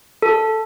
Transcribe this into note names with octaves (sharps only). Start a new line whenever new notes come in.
A4